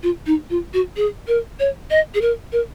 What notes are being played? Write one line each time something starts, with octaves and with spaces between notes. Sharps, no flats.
F4
D#4
F4
F#4
G#4
A#4
C#5
D#5
G#4
A#4
A#4